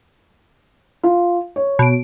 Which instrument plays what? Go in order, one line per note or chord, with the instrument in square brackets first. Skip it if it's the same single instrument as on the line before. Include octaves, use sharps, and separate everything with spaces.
[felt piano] F4
C#5
[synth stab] B2 D7